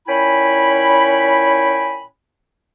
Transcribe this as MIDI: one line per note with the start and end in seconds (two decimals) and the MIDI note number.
0.07 2.03 46
0.07 2.03 61
0.07 2.03 64
0.07 2.03 79
0.07 2.03 80
0.07 2.03 83